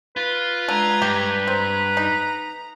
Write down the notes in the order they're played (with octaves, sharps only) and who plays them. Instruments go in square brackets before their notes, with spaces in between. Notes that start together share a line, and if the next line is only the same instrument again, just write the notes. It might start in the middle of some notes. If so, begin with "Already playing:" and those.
[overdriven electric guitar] F4 [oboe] B4
[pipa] D3 [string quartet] G#3 A#5 G#6
[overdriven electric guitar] G2 [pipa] G4
[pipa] C4 [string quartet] A#5
[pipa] D#4